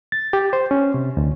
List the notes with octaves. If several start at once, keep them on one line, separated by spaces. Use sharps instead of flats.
A6
G4
C5
C#4
C3
D2